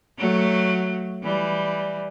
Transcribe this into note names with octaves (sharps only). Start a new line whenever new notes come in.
F#3 A3
E3 G3